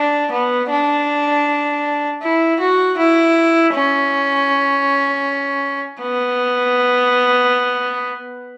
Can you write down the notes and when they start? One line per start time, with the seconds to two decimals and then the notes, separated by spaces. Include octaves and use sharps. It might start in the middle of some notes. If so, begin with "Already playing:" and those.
Already playing: D4
0.31 B3
0.70 D4
2.22 E4
2.60 F#4
2.98 E4
3.74 C#4
6.02 B3